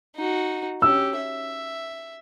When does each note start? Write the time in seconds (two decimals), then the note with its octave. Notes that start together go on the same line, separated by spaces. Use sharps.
0.16 D#4 F#4
0.82 C#4 G4 E6
1.16 E5